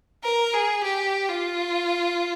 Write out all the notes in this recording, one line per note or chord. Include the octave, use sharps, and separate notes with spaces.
A#4
G#4
G4
F4